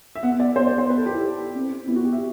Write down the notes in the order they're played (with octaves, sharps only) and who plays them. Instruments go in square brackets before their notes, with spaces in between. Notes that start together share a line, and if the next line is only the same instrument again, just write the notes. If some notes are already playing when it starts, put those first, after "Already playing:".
[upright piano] E5
[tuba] B3 [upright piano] F#5
[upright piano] E5
D5
[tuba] B3 [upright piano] C5
[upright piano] D5
C5
B4
A4
G4
E4
[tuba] C4
[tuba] B3 [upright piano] E4
[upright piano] F#4
G4
E5